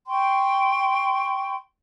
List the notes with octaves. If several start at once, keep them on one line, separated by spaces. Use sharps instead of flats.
G5 C6 C#6